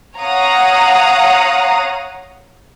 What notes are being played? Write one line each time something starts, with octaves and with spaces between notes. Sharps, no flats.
C#5 F5 F#5 A#5 D#6 A#6